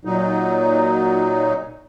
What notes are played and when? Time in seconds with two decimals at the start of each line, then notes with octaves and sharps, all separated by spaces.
0.05 A#2 F#3 D#4